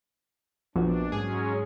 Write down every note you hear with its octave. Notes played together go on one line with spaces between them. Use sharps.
A#1 F2 B3 D4 F#4
G#2 F#3 G#3 C#4 G#4